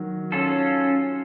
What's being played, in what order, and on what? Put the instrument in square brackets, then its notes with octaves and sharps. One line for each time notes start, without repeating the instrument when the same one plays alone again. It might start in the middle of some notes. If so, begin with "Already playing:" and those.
Already playing: [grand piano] D#3 F#3
[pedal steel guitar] C#4 F4 A4